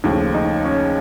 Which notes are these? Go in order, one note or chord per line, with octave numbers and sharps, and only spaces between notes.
D#2 C#3 F3 A3
D#4
C#4